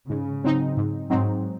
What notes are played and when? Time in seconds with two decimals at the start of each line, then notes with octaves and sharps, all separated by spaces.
0.10 G#2 C#3
0.44 F#3 C4 D#4
0.77 G#2
1.10 G#2 F#3 C4 D#4